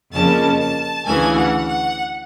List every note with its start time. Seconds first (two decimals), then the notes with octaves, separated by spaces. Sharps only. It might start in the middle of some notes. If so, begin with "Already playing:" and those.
0.12 F2 C#3 F3 A#3 C#4 A5
0.59 A5
1.05 D2 C#3 E3 G#5
1.35 F#5
1.67 F#5